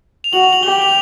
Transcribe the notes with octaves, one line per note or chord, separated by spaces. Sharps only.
F7
F#4 F#7
F7
F#7
G4 G7
F#7
F7